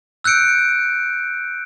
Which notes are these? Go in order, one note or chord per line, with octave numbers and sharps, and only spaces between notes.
E6 F#6 G6 C#7 D7